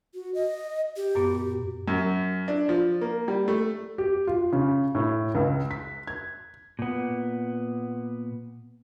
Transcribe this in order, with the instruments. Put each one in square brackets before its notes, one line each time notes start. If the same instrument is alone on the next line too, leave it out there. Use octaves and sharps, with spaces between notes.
[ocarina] F#4
D#5
G4
[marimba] F#2 A#2 B3
[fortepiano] F#2
D4
F3
A#3
G3
A3
[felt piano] G4
F4
C#3
A2
C#2
B6
G#6
[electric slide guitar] A#2 B3